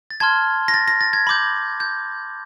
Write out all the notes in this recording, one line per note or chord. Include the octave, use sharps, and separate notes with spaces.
A6
A5 C6 F6 G#6
A#6
A6
A#6
A6
G#6
B5 D6 G6
G6